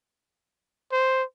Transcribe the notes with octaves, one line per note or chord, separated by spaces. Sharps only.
C5